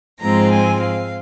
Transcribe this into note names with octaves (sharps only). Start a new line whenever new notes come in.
G#2 F3 G#3 C4 F4 A#5
G#5
F5